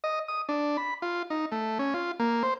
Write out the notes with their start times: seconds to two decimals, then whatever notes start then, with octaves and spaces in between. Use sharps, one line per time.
0.04 D#5
0.28 D#6
0.49 D4
0.77 B5
1.02 F4
1.30 D#4
1.52 A3
1.79 C#4
1.94 F4
2.20 A#3
2.43 C5